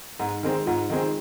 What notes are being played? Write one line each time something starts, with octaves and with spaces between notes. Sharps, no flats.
G#2 D#4
D#3 G#3 C4
G#2 F4
D#3 G#3 C4